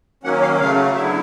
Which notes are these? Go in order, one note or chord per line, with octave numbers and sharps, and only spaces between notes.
D#3 F#3 A#3 C#4 F#5
F5
C#3 F#3 A3 F5
D3 F#3 B3 E4 E5